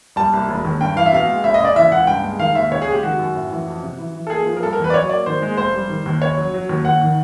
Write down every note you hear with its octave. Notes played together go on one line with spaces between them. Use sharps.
G3 A5
C2
E1
D#2
G2 G5
E3 F5
E5
B2 F5
G#3
F#1 E5
D#5
C#3 D5
E3 E5
C#2 F#5
G2 G5
G#3
D#3 F5
D#2 E5
C#2 C#5
G#4
G#3 G4
D#3 F#4
F#2
A2
E3
F2
C3
E3
E3
A4
A#3 G#4
F3
A#4
G3 A4
A#4
E2
B4
D5
F#3 C#5
A#3 D5
D#3 C5
G#3
F1 C5
G3
D#3
D#2
F#1 C#5
F#3
F#3
D#2
D#2 F#5
D#3